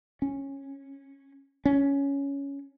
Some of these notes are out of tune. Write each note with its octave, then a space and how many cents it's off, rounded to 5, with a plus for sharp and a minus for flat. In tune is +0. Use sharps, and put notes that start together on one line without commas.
C#4 -15
C#4 +10